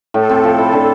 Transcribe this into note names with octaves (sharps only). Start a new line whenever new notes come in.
A2 A4
C4
F3
E4
D3